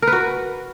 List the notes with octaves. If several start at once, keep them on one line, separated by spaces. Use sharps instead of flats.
A#4
B4
F#4